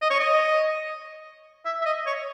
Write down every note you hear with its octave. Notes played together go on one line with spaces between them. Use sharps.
D#5
C#5
D#5
E5
E5
D#5
C#5